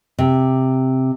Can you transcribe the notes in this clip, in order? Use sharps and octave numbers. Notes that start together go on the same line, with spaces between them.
C3